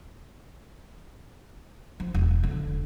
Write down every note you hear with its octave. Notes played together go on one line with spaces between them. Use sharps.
F3
E1
D3